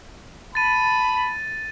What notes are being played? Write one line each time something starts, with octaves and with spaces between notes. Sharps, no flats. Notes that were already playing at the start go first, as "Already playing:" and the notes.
A5 B5 A6 D#7